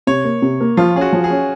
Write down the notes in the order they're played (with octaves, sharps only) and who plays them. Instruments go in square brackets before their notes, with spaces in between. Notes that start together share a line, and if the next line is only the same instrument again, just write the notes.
[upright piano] C3 [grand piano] C#5
[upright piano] A#3
C3
A#3
[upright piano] F3 [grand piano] F4
[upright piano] C#4 [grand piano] G#4
[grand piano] F#4
[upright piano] F3
[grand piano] G#4
[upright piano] C#4